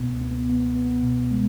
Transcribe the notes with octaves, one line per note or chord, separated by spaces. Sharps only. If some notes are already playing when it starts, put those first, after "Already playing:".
Already playing: C#2 B2 B3
B3
B3
B3
B2
G#3